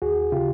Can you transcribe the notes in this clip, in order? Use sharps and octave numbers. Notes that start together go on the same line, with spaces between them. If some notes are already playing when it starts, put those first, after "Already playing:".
D#2 F#4 G#4
C#3 F4 G4